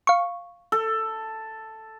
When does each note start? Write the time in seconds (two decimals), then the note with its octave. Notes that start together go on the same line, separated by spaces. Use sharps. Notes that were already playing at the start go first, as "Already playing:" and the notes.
0.07 F5 C#6
0.72 A4